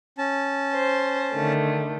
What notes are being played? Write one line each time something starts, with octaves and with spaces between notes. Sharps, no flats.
C#4 A5
C5
D3 D#3 A3